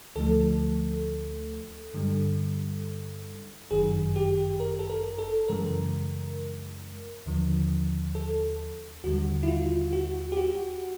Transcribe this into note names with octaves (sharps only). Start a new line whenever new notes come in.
D2 D3 F3 A3 A4
G2 D3 G3
G1 F#2 D#3 G#4
G4
A#4
A4
A#4
A4
F#2 C#3 E3 G#3 A#4
D#2 D3 F3
A4
D#2 D3 G3 F#4
E4
F4
F#4
G4
F#4